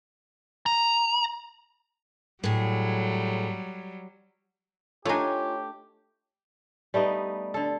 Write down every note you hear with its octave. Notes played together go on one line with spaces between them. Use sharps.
A#5
A2 F#3 G3 G#4
A3 D4 D#4 F4 G4 C#5 G#5
G3 A3 B3 D#4
D3 A4